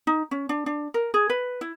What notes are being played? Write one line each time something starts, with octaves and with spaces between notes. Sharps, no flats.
D#4
C#4
D4
D4
A#4
G#4
B4
E4